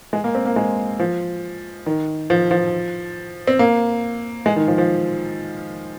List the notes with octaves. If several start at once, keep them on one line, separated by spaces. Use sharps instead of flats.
G#3
A#3
C4
A#3
G#3
F3
D#3
F3
F3
C4
A#3
G#3
D#3
F3
F3